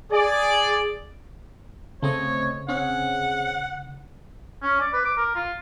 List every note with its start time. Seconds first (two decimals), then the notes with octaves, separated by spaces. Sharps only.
0.12 G#4 D5
2.03 C#3 A3 C4 C#5 D#5
2.68 C4 C#4 G#4 F#5
4.62 C#4
4.80 D5
4.93 B4
5.05 D6
5.17 A#4
5.35 F4